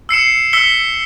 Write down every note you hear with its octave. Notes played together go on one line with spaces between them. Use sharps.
E6 C7 C#7 E7
E6 B6 C#7 G7